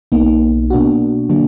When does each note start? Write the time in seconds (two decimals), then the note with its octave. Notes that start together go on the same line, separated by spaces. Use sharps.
0.12 B1 B2 A#3 D#4
0.70 B2 A#3 D4 F#4
1.29 D3 F#3 A#3 D4